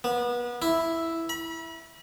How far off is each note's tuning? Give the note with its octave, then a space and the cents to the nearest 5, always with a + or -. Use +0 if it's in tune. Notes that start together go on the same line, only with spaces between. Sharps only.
B3 -30
E4 +0
B5 -35